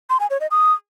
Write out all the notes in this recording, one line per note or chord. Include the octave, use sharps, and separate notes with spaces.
C6
G#5
C#5
D#5
D#6